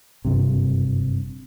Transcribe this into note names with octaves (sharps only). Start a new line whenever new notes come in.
F#1 G2 C3